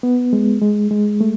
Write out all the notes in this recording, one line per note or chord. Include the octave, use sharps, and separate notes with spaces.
B3
G#3
G#3
G#3
A3